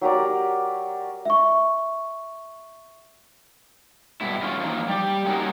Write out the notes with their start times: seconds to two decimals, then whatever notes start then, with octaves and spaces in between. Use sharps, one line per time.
0.01 F#3 G4 A#4 D5
1.25 E5 C#6
4.21 G2 B2 E4
4.42 E3 C#4 F4
4.60 F3 F#3 A#3 D#4
4.88 G3 G4
5.25 G3 A#3 C#4 D#4 F#4 A#4